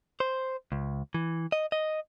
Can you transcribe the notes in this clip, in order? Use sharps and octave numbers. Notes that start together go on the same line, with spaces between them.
C5
C#2
E3
D#5
D#5